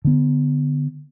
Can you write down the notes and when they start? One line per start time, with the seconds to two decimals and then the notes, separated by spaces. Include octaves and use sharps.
0.05 D3 B3